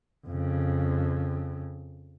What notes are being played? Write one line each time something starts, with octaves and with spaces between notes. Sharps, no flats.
F2 C#3